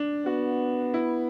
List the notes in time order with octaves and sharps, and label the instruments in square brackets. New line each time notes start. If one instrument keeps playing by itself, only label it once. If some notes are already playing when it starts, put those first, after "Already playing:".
Already playing: [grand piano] D4
[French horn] B3 [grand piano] F#4
[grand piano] E4